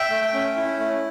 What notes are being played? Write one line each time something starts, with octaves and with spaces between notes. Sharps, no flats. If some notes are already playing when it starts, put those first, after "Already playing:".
Already playing: E5 G5
A3
C#4
E4
A3